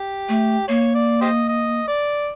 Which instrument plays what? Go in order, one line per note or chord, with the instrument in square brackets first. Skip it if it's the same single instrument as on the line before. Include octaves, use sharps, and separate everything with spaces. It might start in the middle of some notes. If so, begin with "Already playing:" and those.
Already playing: [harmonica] G4
[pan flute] A3
[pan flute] A#3 [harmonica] C#5
[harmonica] D5
G4 C5 D#5
D#5
D5